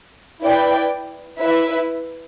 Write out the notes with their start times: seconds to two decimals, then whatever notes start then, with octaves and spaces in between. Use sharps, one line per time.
0.40 E4 B4 D5 G5
1.38 E4 B4 E5